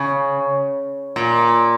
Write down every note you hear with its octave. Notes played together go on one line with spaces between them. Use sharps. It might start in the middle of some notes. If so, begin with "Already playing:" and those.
Already playing: C#3
A#2